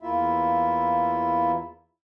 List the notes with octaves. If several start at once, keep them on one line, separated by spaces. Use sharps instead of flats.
E2 A#3 E4 F4 E5